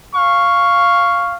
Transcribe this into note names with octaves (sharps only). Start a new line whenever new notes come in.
F5 C#6